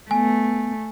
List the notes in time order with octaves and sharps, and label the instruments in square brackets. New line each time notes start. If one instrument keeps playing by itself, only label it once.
[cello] A3 [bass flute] B3 [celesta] G#5